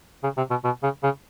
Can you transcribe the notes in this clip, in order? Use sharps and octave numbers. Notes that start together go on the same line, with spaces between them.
C#3
C3
B2
B2
C#3
C#3